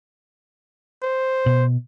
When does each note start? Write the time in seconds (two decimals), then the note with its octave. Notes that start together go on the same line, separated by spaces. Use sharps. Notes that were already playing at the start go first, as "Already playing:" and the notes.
1.03 C5
1.46 B2